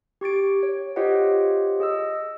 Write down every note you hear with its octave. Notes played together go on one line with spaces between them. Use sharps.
G4 C#6 A6 D7
C#5
F4 G4 C5 C#5 D#5 F#5
G#4 D#5 E6